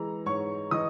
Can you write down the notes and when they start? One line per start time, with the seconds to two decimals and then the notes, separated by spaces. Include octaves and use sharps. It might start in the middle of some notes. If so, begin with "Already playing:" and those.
Already playing: E3 G#3 A#5
0.26 G#2 C#5 C#6
0.71 E3 D#5 D#6